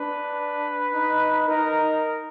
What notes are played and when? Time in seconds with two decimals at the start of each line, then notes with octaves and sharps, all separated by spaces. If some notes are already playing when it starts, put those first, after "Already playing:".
Already playing: D4 B4
0.93 D#4
1.47 D#4 A#4